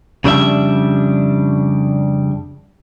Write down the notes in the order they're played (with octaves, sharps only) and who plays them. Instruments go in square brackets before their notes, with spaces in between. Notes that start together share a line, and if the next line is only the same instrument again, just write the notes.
[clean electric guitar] F2 C#3 G3 D4 F4 E5